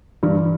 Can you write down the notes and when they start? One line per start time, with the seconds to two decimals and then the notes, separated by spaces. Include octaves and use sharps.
0.23 G2 E3